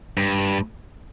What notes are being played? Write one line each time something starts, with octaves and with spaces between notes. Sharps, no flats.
G2